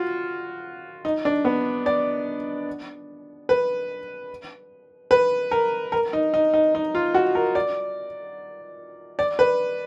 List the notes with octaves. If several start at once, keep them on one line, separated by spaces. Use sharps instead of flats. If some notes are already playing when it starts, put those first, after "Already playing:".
Already playing: F4 F#4
D#4
D4
B3
D5
B4
B4
A#4
A#4
D#4
D#4
D#4
D#4
F4
F#4
A#4
D5
D5
B4